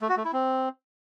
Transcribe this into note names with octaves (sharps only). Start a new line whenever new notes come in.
A3
F#4
A3
E4
C4